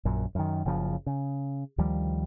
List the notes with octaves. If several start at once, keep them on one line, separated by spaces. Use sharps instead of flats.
A#1 F#2
F#2 D#3
F#1 C#3 F3
C#3
D2 D#3 F3 G3